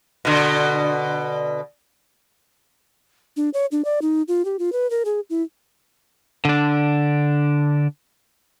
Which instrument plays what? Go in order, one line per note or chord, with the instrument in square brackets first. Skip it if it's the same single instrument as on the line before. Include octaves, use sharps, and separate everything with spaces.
[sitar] B2 D3
[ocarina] D4
C#5
D4
D5
D#4
F4
G4
F4
B4
A#4
G#4
E4
[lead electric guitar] D3 D4